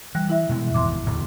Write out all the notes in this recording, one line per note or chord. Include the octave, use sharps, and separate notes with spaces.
E3 G3 F#6
E4 E5
B2 E3 G#3
G#1 E2 G#2 C6 D6
D1 E2 A2